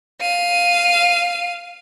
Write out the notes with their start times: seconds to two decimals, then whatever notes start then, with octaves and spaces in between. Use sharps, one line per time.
0.20 F5 D#7